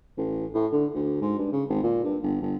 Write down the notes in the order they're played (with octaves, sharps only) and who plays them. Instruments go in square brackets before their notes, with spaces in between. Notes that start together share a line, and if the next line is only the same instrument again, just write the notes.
[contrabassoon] A1
A2
D3
D2
G#2
G2
C#3
G#1
A#2
G2
G1
G1